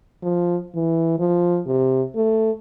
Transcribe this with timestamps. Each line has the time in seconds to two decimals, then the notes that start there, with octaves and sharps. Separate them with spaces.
0.22 F3
0.75 E3
1.19 F3
1.66 C3
2.15 A3